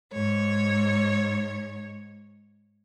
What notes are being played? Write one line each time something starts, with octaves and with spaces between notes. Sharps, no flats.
G#2 C#5